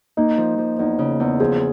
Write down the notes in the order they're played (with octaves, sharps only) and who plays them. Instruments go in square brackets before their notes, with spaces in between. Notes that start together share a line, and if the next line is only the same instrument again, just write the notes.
[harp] A#3 [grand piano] D#4
[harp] F3
F3
[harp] E2 [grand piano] D#4
[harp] C#3
E2
[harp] F3 [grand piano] G#4